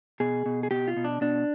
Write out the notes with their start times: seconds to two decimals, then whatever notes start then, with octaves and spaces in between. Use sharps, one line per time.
0.20 B2 G#4
0.46 B2
0.63 G#4
0.71 B2 G4
0.88 F4
0.97 B2
1.04 D4
1.21 B2 D4